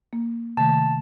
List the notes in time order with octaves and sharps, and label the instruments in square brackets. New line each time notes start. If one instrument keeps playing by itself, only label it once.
[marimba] A#3
[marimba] C3 D#3 A3 [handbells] A5